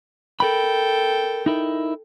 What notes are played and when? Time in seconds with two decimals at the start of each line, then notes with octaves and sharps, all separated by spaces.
0.40 A4 A#4 G5 B5
1.46 D#4 E4 A#4